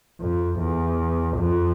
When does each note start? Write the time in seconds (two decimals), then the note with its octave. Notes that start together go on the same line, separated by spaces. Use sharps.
0.21 F2
0.59 E2
1.38 F2